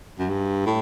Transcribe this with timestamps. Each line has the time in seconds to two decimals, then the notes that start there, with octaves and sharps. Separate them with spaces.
0.19 F#2
0.29 G2
0.66 A2